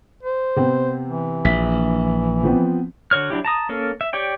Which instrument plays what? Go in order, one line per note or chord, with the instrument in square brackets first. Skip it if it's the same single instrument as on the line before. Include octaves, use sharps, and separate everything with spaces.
[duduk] C5
[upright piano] C3 B3 C4
[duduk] E3
[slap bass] A#1 [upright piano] E5 B6
[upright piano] F3 B3 C4
[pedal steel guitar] D3 F#4 C#5 F6
F#3 D4 E4 G4
A5 A#5 D#6
A#3 C#4 A4 A#4
E5
G4 C#5 D5 G5